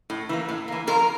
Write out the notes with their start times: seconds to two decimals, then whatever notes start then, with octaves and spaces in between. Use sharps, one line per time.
0.10 A2
0.29 E3 A#3
0.49 A2
0.68 E3 A#3
0.87 F2 A#4